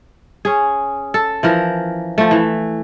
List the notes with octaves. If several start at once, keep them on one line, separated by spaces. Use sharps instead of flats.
C#4 G#4
A4
E3 F3 A#4
F3 A3
E3